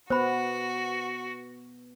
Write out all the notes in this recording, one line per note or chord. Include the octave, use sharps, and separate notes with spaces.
B3 F#4 C5 B5